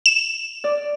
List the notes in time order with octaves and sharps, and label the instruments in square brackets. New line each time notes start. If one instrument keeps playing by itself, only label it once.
[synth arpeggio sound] E7
[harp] D5